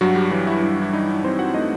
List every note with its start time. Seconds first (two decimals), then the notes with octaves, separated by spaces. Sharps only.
0.01 G2 F#3 F#4
0.16 G3 G4
0.31 E3 F#3 F#4
0.47 E4
0.62 G2 E4
0.81 E4
0.93 G2 D#4
1.24 E3 C4 C5
1.39 F#4 F#5
1.54 A3 D#4 D#5